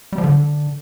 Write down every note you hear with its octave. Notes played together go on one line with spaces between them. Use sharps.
G3
F3
D3